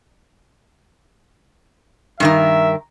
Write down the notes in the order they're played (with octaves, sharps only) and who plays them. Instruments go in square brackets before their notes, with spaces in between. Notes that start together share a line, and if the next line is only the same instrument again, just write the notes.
[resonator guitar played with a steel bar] G2 D#3 A#4 [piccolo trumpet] E5